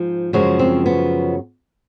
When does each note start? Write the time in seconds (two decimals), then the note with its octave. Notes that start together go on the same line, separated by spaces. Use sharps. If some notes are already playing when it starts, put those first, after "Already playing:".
Already playing: G#2 F3
0.33 F#2 C#3 F3 G#3 F#4
0.59 C4
0.86 B3